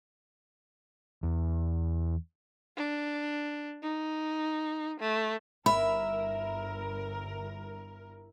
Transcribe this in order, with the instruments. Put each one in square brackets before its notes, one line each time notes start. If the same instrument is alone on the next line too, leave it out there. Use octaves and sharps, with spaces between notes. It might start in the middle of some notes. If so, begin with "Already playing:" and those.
[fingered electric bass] E2
[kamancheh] D4
D#4
A3
[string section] G1 A#4 [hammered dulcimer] E4 [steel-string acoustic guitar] E5 [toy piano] B5